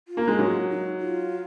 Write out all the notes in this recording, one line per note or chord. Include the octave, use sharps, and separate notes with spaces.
F4
A#3
G#3
F#3
D#4
F4